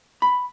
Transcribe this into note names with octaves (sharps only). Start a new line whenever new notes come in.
B5